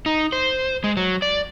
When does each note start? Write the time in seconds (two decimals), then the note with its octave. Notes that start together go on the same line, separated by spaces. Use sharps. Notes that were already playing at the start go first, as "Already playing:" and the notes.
0.06 D#4
0.32 C5
0.84 G#3
0.97 F#3
1.22 D5